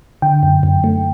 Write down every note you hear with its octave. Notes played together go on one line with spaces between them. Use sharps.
D3 G5
F#2
F#2
A3